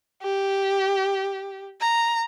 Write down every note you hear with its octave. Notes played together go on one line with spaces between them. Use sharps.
G4
A#5